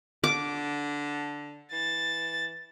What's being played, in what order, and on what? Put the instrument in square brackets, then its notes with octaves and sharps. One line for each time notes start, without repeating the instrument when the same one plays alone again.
[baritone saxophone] D3 [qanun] D6
[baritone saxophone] E3 [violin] A6